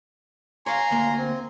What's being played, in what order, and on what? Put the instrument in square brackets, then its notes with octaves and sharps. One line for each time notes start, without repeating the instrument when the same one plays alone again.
[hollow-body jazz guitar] C#5 F5 [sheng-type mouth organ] G#5 A#5 C6
[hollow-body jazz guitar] D2 A#3
[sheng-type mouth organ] C4